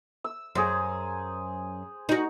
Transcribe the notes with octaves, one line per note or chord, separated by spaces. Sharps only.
E6
F#2 G#4 C5
D#4 F#4